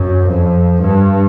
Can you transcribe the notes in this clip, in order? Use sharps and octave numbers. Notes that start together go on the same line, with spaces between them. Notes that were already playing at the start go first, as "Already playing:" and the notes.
Already playing: F#2
F2
G2